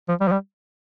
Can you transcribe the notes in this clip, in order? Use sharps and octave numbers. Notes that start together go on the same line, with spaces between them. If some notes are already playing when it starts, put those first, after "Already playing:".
F3
G3
F3
G3